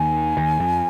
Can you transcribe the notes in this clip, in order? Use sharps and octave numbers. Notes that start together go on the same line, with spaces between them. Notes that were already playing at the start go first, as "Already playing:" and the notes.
Already playing: D#2 D#3 G#5
D#2 D#3
F2 F3